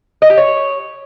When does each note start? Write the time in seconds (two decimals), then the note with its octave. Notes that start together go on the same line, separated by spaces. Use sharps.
0.22 D#5
0.30 G4
0.37 C#5